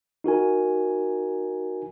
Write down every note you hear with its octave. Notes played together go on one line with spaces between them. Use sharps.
D#4 F#4 A#4 G#5